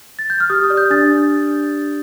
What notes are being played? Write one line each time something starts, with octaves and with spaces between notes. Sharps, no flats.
A6
G6
F6
G4 D#6
D#6
D5
G6
D4 A6